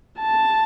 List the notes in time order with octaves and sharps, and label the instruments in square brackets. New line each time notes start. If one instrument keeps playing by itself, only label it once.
[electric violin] A5